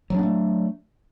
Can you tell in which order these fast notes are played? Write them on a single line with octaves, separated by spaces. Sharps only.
F#3 D4 B3 A3